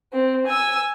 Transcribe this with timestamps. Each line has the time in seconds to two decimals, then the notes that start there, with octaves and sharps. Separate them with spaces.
0.13 C4
0.47 G#5 E6